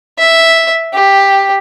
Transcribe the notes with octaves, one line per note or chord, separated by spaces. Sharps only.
E5
G4